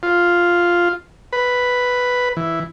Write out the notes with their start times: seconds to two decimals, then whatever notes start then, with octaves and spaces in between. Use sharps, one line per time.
0.03 F4
1.33 B4
2.37 E3